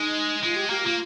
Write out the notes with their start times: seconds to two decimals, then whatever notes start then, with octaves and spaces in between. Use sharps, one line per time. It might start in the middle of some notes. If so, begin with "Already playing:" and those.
Already playing: G#3 D#4
0.43 G#3 F4
0.56 G4
0.70 A#3 G4
0.83 A#3 F4